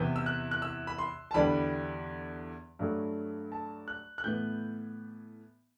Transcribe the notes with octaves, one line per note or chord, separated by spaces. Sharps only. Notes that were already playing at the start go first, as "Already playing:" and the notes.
Already playing: E2 C3 E3 B3 E4 G6
E6
F#6
F#6
E6
B5
C6
A5
E2 D3 G3 B3 D4 B5
G2 F#3 A3
A5
F#6
F#6
A2 E3 B3 G6